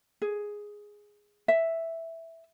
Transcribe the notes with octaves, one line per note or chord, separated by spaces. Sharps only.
G#4
E5